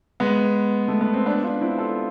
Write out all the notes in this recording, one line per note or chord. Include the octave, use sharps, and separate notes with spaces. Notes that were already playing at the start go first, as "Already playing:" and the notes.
G#3 B3
A3
B3
C4
B3 D4
D4 F4
C4 E4
F4 A4